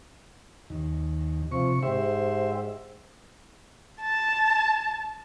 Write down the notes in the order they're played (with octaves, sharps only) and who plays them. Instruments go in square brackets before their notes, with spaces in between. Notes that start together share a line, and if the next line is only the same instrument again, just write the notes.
[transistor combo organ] D#2
[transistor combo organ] C3 C#6 [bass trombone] F3
[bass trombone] G#2 [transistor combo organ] G4 C5 E5
[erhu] A5